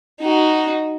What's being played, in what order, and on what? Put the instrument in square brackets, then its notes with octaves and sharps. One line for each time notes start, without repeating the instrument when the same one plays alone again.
[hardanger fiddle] D#4 F#4